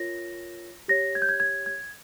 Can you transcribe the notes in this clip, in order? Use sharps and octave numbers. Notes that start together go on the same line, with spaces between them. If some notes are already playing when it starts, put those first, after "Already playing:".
Already playing: F4 A#4 C#5 A#6
G4 C#5 A#6
G#6
G6
G#6
G#6
G#6